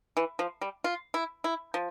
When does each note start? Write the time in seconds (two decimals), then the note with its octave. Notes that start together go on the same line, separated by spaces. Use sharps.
0.17 E3
0.39 F3
0.61 G3
0.84 F4
1.14 E4
1.44 E4
1.74 F3